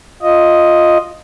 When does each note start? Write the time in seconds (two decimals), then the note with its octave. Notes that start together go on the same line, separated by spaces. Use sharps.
0.22 F4 D#5